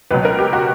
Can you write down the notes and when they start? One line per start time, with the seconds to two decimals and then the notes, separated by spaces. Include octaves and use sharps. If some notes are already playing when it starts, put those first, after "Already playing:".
0.11 C#2 B2 F#3 B4
0.25 A#4
0.39 G4
0.53 F#4